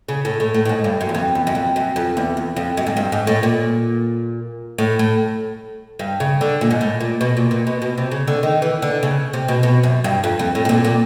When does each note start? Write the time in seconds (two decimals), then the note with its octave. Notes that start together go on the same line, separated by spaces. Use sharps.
0.08 C#3
0.25 A2
0.40 A2
0.54 A2
0.65 A2
0.69 G#2
0.84 G2
1.01 F#2
1.09 E2
1.15 F2
1.35 E2
1.47 F#2
1.55 F2
1.76 F#2
1.96 F2
2.17 E2
2.37 E2
2.56 F2
2.77 F#2
2.87 G#2
2.97 G2
3.12 G#2
3.27 A2
3.43 A#2
4.78 A2
4.99 A2
5.99 G2
6.20 C#3
6.41 D3
6.61 A#2
6.71 G#2
6.81 A2
7.00 A#2
7.21 B2
7.37 A#2
7.51 A#2
7.67 B2
7.82 B2
7.98 C3
8.11 C#3
8.27 D3
8.43 D#3
8.62 E3
8.82 D3
9.03 C#3
9.33 C3
9.48 B2
9.63 B2
9.83 F#2
10.04 G2
10.24 F2
10.39 F2
10.55 A2
10.65 A2
10.69 A#2
10.84 A#2